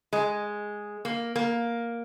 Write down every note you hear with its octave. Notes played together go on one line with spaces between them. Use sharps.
G#3
A#3
A#3